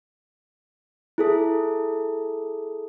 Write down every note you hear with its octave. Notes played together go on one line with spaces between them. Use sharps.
E4 G#4 A4